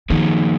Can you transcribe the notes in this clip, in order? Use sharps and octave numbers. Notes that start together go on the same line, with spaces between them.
D#3 F3 A#3 D#4 G#4